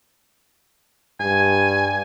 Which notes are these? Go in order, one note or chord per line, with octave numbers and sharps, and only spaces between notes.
G2 G#5